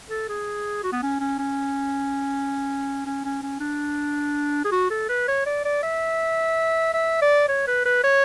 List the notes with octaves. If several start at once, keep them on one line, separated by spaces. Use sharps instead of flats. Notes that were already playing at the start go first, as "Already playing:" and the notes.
A4
G#4
F#4
B3
C#4
C#4
C#4
C#4
C#4
C#4
D4
G#4
F#4
A4
B4
C#5
D5
D5
E5
E5
D5
C#5
B4
B4
C#5